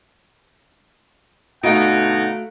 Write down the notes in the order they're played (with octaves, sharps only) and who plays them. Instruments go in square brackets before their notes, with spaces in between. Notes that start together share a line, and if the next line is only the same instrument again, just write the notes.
[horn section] B2 D3 D#4 [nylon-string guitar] A3 F#4 [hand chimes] F5 D7 [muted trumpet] F#5